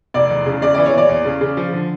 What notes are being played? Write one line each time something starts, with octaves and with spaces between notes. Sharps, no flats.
F1 D5
E2
C#3
C#3 D5
D5
E3
C#5
E3 D5
E2
C#3
C#3
F3
D3